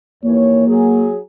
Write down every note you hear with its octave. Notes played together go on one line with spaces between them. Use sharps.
D#2 E3 A#3 C#5
F#3 G#4